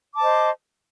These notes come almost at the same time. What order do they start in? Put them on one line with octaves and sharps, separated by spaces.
D6 A5 C5 D#5